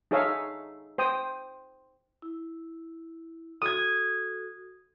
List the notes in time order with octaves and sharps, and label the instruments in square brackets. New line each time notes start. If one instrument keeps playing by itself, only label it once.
[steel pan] D#4 G#4 A4 C#5 E5 F5
C5 G5 D#6
[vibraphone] E4
[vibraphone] F#4 A4 [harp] D#6 G#6